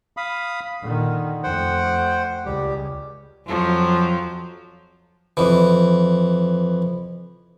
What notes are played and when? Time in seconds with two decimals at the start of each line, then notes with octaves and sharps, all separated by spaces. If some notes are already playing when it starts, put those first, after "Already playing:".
0.17 F5 B5 D#6
0.82 A#2 D3 D#3
1.43 F2 A3 C5 F#5 G5
2.45 C#2 G3 G4
3.46 F2 F3 F#3
5.37 F2 E3